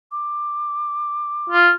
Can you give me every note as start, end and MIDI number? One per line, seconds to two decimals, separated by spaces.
0.12 1.57 86
1.50 1.70 65